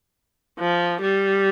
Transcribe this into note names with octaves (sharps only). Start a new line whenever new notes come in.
F3
G3